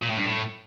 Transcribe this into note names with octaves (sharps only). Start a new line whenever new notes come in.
A#2
A2
G2
A2